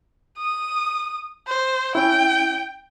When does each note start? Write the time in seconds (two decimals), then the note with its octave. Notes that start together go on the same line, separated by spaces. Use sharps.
0.38 D#6
1.47 C5
1.95 C#4 E4 G5